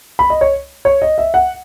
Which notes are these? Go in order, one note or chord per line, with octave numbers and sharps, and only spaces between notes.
B5
D#5
C#5
C#5
D#5
E5
F#5